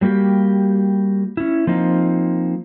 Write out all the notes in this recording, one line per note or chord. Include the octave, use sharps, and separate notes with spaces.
F#3 G3 A#3 F#4 G4
C#4 E4
F3 A#3 C4 D#4